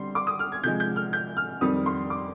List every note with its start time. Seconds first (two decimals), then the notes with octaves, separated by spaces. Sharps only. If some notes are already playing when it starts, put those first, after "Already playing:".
Already playing: D3 G3 C4 C6
0.15 D6
0.27 D#6
0.39 F6
0.52 G#6
0.64 C3 F3 G#3 G6
0.80 G6
0.96 F6
1.13 G6
1.37 F6
1.61 F2 D#3 G3 C4 D#6
1.86 C6
2.10 D6